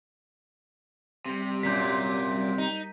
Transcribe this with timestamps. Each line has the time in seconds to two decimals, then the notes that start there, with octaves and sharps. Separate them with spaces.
1.26 C3 G3
1.63 F#2 A#2 G6 B6
2.58 D#4